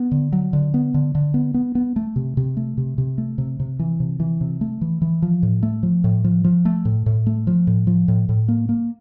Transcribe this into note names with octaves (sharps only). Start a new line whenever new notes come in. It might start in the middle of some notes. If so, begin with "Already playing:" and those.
Already playing: B3
D3
F#3
D3
B3
D3
D3
B3
B3
B3
A3
C3
C3
A3
C3
C3
A3
C3
C3
E3
C3
E3
C3
A3
E3
E3
F3
A2
A3
F3
A2
F3
F3
A3
A2
A2
A3
F3
A2
F3
A2
A2
A#3
A#3